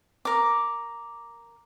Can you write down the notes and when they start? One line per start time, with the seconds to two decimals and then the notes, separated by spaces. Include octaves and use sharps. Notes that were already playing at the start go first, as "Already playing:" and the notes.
0.25 A#4 D6